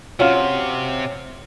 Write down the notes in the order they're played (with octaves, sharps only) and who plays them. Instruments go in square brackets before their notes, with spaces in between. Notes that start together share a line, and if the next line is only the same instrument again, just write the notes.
[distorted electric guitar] C3 [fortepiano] C#4 F4 [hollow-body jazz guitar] F#4